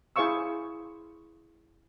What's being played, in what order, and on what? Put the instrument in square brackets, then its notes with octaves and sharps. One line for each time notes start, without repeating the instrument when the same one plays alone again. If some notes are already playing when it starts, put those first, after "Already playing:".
[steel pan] E4 G#4 C5 F5 C#6 E6